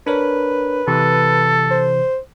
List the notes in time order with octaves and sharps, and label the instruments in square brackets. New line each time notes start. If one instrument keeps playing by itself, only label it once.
[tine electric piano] D4 A#4 C#5 [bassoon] B4
[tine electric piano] C3 E3 [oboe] A4
[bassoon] C5